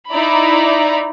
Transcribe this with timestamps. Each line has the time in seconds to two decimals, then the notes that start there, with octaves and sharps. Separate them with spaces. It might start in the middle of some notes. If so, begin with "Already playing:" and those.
0.11 D#4 E4 D5 A#5 B5